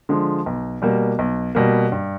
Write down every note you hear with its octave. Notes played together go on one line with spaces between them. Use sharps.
D3 F3 G#3
B1
B2 G3 A#3
B1
B2 G3 A#3
G2